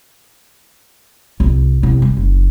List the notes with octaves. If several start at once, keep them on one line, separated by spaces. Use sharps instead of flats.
C2
C2
G3
F#1